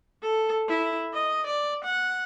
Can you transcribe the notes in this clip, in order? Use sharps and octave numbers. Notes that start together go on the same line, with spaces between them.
A4
E4
D#5
D5
F#5